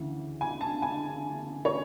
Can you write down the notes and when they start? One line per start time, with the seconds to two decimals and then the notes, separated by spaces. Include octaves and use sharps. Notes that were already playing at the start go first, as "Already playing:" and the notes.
Already playing: D2 C#3 E3
0.41 G#5
0.61 A5
0.82 G#5
1.65 C#5